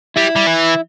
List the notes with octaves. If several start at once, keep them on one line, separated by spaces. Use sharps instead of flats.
G3 E4
G3
E3